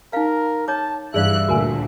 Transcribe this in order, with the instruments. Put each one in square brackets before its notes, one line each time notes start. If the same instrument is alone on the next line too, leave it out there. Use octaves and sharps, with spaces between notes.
[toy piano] D#4 F5 [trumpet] A#4
[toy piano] C#5 D6 [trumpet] A5
[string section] G2 E3 F#6 [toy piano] G#4 D5 F5 [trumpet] E5
[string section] D2 A#2 A3 [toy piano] F#4 A#4 G#5